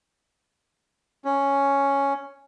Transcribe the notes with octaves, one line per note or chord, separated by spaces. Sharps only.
C#4